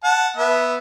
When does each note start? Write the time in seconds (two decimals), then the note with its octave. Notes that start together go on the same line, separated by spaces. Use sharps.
0.04 F#5 A5
0.37 B3 E5